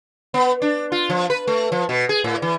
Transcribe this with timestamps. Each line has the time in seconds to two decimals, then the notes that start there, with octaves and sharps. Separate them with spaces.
0.34 B3
0.62 D4
0.92 F4
1.10 F3
1.30 B4
1.47 A3
1.72 F3
1.89 B2
2.09 G#4
2.24 A2
2.42 E3